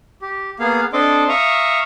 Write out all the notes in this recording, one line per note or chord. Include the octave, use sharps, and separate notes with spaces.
G4
A#3 B3 G#4 F5
C4 D4 A4 D#5 C6 D6
E5 F5 A#5 C#6 D#6